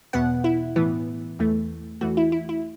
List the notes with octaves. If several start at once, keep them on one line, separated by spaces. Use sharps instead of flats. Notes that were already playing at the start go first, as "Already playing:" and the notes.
E2 B2 B3 F#5
E4
A2 E3 B3
E2 E3 A3
E2 E3 A3 F#4
E4
E4
E4